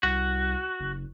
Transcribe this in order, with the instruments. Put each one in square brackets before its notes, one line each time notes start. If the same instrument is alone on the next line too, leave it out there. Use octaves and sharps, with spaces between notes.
[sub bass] C2 [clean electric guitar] F#4
[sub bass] F#1